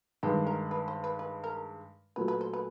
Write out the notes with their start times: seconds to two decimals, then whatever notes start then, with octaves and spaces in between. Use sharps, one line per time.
0.23 G2 D#3 G#3 G4
0.46 A#4
0.71 B4
0.88 C5
1.04 B4
1.19 B4
1.44 A#4
2.16 A#2 F#3 A3 B4
2.28 B4
2.41 C5
2.53 B4